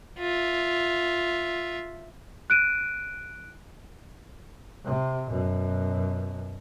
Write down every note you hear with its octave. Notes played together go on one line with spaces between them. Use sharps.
F4 E5
F#6 D7 D#7
C3
F#2 B2